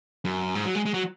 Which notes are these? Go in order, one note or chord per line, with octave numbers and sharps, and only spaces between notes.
F#2
G#2
F#3
G#3
G#3
F#3